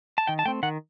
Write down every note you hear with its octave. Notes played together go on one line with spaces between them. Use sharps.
A5
D#3 G5
A5
A3 C4 G5
D#3 F#5